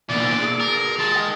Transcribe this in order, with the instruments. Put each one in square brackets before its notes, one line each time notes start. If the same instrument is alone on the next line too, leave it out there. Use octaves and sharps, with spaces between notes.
[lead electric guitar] B2 A#3 [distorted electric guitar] D3 E3 [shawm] D5
[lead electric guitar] G#4 A4
[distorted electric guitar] A#4
[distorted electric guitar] G#3 [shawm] A5
[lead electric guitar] D#5 G5